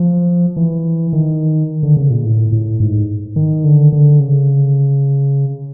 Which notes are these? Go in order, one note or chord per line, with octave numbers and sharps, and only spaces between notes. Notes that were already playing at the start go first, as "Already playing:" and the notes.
Already playing: F3
E3
D#3
D3
C#3
A#2
A2
A2
G#2
D#3
D3
D3
C#3